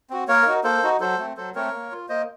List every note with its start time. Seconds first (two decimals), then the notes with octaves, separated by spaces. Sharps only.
0.10 C4 F#4
0.28 A#3 A#4 C#5
0.46 D#4 F#4
0.64 A#3 A4 C5
0.83 D#4 F#4
1.00 F#3 A4 C5
1.19 A3 C4
1.37 F#3 A4 C5
1.55 A3 C4 A#4 C#5
1.74 A#3
1.92 F4
2.09 A#3 C5 D#5